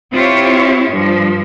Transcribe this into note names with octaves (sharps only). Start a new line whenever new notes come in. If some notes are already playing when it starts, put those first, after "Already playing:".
C4 E4 F4 G4 C#5
G2 F3